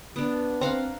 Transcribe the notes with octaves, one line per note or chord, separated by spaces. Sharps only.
B3 D4
C4 F5 F#5 A#5